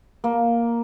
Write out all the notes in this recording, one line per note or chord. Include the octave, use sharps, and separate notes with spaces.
A#3